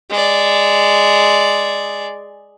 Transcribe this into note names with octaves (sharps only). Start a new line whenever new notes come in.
G#3 D5